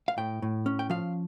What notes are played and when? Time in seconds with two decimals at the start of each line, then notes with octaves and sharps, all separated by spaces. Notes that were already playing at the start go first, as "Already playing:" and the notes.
0.08 F5
0.18 A2 G5
0.42 A2
0.66 C#4
0.79 G5
0.90 F3 F5